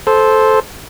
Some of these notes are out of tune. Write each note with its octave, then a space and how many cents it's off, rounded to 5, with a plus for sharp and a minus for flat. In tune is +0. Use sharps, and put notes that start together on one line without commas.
A4 -15 C5 +0